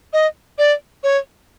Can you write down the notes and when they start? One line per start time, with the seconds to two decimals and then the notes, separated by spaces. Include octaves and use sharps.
0.13 D#5
0.58 D5
1.04 C#5